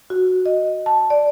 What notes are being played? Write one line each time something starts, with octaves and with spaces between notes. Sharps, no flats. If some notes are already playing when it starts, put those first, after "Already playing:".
F#4
D#5
A5
D5